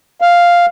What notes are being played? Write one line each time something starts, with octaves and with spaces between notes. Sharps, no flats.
F5